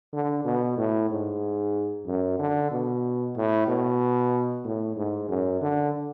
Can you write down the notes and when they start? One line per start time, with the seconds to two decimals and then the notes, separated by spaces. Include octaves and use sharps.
0.13 D3
0.45 B2
0.77 A2
1.09 G#2
2.06 F#2
2.39 D3
2.71 B2
3.36 A2
3.68 B2
4.64 A2
4.96 G#2
5.29 F#2
5.61 D3